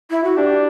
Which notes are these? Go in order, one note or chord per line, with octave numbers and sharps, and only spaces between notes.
E4
F#4
D4 G4